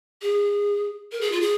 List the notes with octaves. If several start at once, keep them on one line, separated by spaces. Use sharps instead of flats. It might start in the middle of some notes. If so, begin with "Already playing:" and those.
G#4
A#4
G#4
F4
G#4